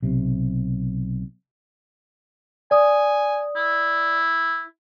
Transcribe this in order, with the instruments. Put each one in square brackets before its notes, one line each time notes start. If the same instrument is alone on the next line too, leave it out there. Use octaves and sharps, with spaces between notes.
[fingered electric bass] B1 C3
[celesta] D5 D#6 [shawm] G#5
[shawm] E4